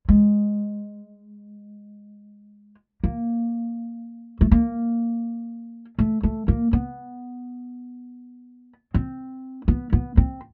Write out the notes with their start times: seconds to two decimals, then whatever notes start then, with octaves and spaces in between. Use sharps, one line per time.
0.09 G#3
3.04 A#3
4.41 A3
4.51 A#3
5.99 A3
6.23 A3
6.48 A#3
6.73 B3
8.94 C4
9.68 B3
9.93 B3
10.17 C4